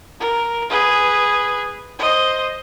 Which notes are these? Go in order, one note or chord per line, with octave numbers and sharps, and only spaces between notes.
A#4
G#4 B4
C5 D#5